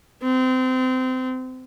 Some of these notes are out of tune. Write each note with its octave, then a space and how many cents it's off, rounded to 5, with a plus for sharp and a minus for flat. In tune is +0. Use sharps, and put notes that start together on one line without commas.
C4 -25